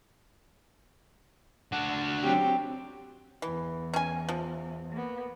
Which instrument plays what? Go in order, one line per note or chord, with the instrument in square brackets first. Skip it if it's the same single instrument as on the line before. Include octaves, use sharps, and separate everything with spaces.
[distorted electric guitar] D4 F#4
[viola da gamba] F#3 C4 G4
[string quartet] E2 [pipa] E3
[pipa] C#4 G#5
F3
[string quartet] A#3 B3